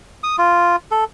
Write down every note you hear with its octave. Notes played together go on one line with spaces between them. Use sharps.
D#6
F4
A4